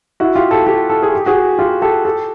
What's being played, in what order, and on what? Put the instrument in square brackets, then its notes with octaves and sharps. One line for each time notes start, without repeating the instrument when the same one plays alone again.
[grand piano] E4 F#4
F4 G4
G4 A4
G4 A4
A4
G#4
G4
F#4 G#4
F4 G4
G4 A4
G4 A4